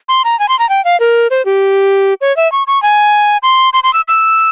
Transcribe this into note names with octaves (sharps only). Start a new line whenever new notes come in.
C6
A#5
G#5
C6
A#5
G5
F5
A#4
C5
G4
C#5
E5
C#6
C#6
G#5
C6
C6
C6
E6
E6